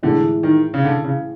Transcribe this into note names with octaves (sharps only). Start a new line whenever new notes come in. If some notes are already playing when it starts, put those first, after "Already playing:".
A2 D3 E3 G#3
D#3
C#3
D3
C#3